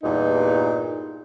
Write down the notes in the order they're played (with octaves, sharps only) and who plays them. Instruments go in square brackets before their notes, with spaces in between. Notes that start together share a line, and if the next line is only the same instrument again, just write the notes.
[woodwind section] E2 G2 A#2 [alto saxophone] D#4